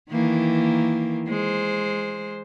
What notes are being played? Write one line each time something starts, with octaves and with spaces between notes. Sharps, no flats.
D#3 E3 A#3
G#3 C5